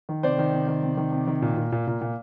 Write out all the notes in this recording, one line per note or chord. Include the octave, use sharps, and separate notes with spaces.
D#3
C3 C5 D5
D#3
C3
D#3
C3
D#3
C3
D#3
A#2
A#2
A#2
A#2
A#2